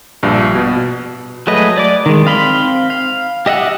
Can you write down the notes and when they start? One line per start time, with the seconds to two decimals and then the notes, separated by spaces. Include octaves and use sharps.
0.23 A#1 G2
0.55 B2
1.47 F#3 G#3 A3 B4 D#5
1.77 D5 D6
2.06 D#3 G#3
2.25 C4 F5 B5 C6
2.90 F5
3.46 G4 D#5 E5 F#5